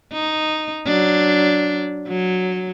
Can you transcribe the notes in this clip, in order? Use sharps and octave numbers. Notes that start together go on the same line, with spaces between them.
D#4
F#3 D4
F#3